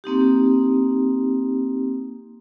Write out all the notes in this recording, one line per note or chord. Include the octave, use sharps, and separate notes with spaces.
A#3 C4 D#4 G4